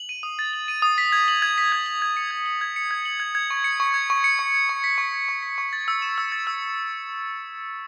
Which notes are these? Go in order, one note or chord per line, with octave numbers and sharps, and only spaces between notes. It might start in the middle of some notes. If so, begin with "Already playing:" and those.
Already playing: F#7
D#7
D#6
A6
F#7
D#7
D#6
B6
G#6
F#7
G#6
B6
G#6
F#7
G#6
C#7
G#6
F#7
G#6
C#7
G#6
F#7
G#6
G#6
C#6
C#7
C#6
G#6
C#6
C#7
C#6
G#6
C#6
B6
C#6
G#6
C#6
B6
C#6
A6
E6
E7
E6
A6
E6